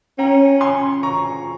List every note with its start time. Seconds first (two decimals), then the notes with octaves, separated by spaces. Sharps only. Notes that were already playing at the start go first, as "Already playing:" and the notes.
0.18 C#4 G5 A#5
0.61 G#5 C6
1.03 A#5 C#6